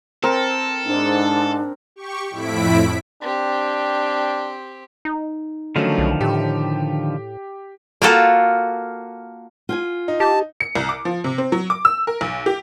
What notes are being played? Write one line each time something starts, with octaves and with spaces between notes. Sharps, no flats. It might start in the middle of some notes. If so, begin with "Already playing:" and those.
C4 A4 A#4
G#2 D4
G4 C#6
F2 A2 E4 B6 D7
C4 D4 G4
D#4
D3 D#3 F3 F#3 A3 C#4
B1
A2 G4
A#3 F4 F#4 A4
F4 G5 G#5
D#4
G4 A5
C#7
C2
D6
F3
C3
C4
F#3
D6
E6
A#4
B1
G4